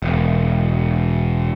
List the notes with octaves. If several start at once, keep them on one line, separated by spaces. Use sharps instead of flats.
E1